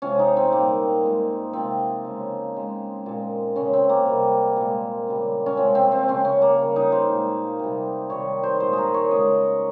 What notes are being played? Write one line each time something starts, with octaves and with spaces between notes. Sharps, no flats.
C3 F3 G#3 C#4
D#4
C4
A#2 G3 A#3
A#2 G#3
C3 F3 G#3 C4
C#3 G#3
C#3 G#3
A#2 G#3
C#3 G#3 C#4
C4
A#3
C3 G3
A#2 G#3
C#3 G3
C#4
C3 F3 G#3 C4
C4
C4
C#3 G#3 C#4
C#4
A#3
C#3 G3
D#4
C5
A#2 G#3
C3 G3
C3 D#3 G3 C#5
C5
A#2 G#3 C5
G#4 A#4
C#5
C#3 G#3 D#5